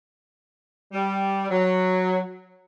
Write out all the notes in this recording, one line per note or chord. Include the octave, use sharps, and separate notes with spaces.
G3
F#3